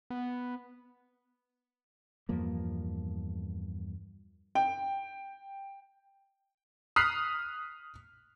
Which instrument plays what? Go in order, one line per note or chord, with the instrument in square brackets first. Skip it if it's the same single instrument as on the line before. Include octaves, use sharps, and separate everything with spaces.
[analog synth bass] B3
[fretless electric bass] E2 G2 F3 A#3
[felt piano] G5
[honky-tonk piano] D#6 F6 F#6 B6 C7